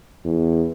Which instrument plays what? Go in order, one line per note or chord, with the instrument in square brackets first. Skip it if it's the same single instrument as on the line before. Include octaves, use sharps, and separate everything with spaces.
[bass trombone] E2